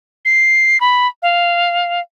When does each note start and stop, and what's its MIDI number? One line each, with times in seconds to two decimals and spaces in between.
0.25 0.80 96
0.80 1.07 83
1.22 2.00 77